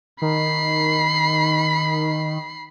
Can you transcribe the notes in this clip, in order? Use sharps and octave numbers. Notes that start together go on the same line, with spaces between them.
D#3 B5 C7